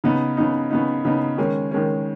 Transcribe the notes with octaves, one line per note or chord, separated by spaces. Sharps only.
C#3 B3 D#4
C#3 B3 D#4
C#3 B3 D#4
C#3 B3 D#4
D#3 G#3 C#4
D#3 G#3 C#4